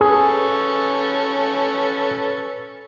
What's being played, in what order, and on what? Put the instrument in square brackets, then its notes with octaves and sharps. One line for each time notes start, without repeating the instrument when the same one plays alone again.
[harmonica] C#4 A4 B4 [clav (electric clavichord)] G#4